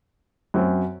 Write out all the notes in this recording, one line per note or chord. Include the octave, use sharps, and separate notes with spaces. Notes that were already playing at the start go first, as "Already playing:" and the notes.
F#2 F#3 C4